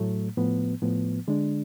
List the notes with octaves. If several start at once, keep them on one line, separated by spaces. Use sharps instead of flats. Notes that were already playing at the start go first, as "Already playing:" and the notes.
Already playing: A2 F#3 A3
A2 F3 B3
A2 F3 B3
D3 G#3 D4